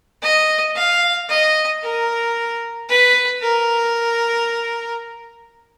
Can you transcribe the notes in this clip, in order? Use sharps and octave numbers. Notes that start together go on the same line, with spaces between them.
D#5
F5
D#5
A#4
B4
A#4